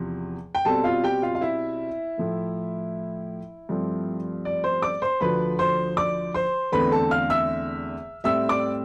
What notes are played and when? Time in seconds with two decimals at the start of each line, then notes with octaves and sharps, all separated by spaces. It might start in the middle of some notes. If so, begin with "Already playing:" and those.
Already playing: E2 C3 F3
0.55 G5
0.65 B2 G3 C4 A4 A5
0.84 F4 F5
1.04 G4 G5
1.22 F4 F5
1.35 F5
1.41 E4 E5
2.18 A2 F3 A3
3.69 G2 F3 A3 C4
4.45 D5
4.64 C5 C6
4.82 D5 D6
5.02 C5 C6
5.21 D2 D3 F3 B4 B5
5.59 C5 C6
5.97 D5 D6
6.34 C5 C6
6.72 E2 D3 A3 C4 B4 B5
6.91 A4 A5
7.11 F5 F6
7.30 E5 E6
8.24 A2 G3 C4 E5 E6
8.49 D5 D6